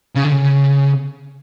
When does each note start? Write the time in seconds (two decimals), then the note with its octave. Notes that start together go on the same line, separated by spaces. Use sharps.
0.16 C#3
0.25 D3
0.32 C#3